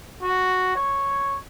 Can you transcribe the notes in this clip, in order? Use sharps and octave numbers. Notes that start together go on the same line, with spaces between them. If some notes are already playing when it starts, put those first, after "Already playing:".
F#4
C#5